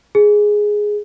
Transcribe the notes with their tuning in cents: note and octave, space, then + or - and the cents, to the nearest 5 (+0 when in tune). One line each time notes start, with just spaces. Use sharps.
G#4 +0